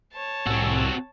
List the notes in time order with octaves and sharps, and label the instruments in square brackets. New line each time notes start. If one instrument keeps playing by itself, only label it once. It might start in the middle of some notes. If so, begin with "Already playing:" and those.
[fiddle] C#5 A5
[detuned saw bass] C2 [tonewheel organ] A2 G#5 E6 [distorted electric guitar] C4 F#4